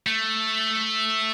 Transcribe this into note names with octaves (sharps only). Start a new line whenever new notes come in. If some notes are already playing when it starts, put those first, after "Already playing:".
A3